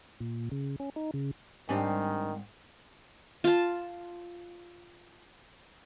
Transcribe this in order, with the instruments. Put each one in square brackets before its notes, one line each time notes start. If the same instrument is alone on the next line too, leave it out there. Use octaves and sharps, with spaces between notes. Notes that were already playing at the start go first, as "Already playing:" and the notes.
[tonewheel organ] A#2
C#3
C#4
D#4
C#3
[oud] G#2 G3 C4 [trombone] D#3 [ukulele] D4 G#5
[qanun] F4 A5